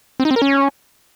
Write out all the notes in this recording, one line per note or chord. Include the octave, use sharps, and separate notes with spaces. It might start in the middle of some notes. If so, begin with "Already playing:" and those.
C4
D#4
C4
A#4
C#4